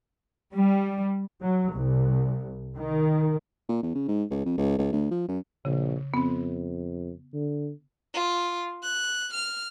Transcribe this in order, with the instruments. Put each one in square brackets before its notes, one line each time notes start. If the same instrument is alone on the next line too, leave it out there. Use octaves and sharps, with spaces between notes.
[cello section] G3
[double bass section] F#3
C2
D#3
[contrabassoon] A#2
E2
C#3
G#2
C#2
F2
C#2
C#2
D2
F3
F#2
[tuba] A#1 [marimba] C#3
[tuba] F2 [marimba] B3 C4
[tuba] D3
[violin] F4
F#6
F6